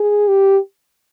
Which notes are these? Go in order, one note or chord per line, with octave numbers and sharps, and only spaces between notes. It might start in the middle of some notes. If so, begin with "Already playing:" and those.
Already playing: G#4
G4